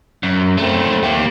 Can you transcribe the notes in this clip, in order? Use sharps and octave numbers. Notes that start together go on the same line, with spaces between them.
F#2
A3 C4
A#3 G4